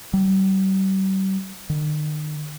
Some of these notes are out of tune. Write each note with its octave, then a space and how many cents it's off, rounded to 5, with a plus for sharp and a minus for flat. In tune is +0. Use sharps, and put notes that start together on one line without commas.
G3 -40
D#3 -45